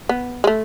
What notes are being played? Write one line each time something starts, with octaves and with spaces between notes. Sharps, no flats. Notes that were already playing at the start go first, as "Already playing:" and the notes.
B3
G#3
A3